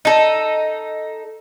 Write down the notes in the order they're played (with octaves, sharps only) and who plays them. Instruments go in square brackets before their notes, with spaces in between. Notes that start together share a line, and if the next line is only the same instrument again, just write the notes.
[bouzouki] D#4 A4